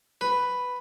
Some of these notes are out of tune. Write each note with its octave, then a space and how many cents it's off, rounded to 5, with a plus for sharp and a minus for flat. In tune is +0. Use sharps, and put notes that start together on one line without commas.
B4 +5